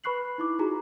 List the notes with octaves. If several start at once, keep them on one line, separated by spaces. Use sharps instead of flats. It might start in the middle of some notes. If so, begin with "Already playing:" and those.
B4 B5 C#6 F#6 C7 F#7
D#4 E4 D6
D#4 F4 F#4 G#4 A#5